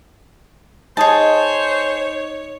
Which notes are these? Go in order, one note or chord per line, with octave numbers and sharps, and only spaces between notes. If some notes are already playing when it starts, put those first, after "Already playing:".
D#4 G#4 C5 C#5 A5